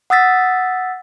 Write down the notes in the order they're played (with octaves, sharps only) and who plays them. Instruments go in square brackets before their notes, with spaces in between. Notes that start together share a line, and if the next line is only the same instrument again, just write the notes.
[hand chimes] F#5 D#6 E6 A6 B6